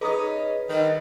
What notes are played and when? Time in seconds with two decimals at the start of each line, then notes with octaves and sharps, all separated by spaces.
0.01 C#4 D#4 G#4 B4 D#5 A#5 D#6
0.69 D3 D#3 G3